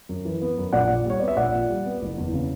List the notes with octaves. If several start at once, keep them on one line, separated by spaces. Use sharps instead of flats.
F#2
E3
B3
F#2
A#1 D5 F#5
A#2
G3 C#5
B3 D5
E5
A#1 D5 F#5
A#2
G3
B3
F#1
E2
C#3